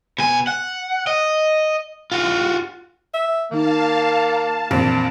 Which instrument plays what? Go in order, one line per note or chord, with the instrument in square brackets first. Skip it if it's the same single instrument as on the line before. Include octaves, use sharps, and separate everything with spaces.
[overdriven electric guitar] B2 G#5
F#5
D#5
F4 F#4
[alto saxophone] E5
[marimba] D#3 D#4 [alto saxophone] A#3 [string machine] F5 A5
[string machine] A5 [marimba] A#5
[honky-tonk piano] A#1 F2 [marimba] A#2 D#3 E3